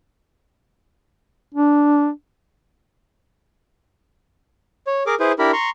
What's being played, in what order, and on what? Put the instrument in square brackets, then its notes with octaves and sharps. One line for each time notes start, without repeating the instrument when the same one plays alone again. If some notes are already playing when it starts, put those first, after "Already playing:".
[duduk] D4
[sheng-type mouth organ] C#5
G#4 A#4 D6
E4 G#4 B4 C5
D4 E4 G4 A#4 B5
A#5 C6 C#6